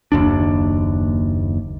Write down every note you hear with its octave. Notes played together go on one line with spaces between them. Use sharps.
F#1 D#2 D4